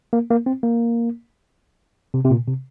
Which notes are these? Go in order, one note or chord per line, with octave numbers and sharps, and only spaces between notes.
A#3
A#3
C4
A#3
C3
C3
A#2
C3